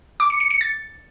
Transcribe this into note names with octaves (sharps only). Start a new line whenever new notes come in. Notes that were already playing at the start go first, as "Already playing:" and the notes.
D6
C#7
C#7
C#7
A6